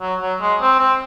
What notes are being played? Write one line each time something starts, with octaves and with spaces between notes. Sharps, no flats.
F#3
F#3
G#3
C4
C4